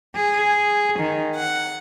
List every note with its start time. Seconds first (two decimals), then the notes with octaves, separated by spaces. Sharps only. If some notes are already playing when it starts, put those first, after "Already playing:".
0.17 G#4
0.99 D#3
1.35 F#5